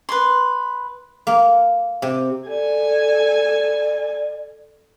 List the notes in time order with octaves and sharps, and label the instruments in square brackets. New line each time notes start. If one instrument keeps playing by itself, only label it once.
[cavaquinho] B4 C6
[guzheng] A#3
C3
[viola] A4 G#5 [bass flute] D5